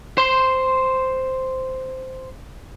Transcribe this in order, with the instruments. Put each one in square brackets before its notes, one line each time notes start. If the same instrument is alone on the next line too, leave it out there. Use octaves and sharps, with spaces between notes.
[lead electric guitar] C5 C6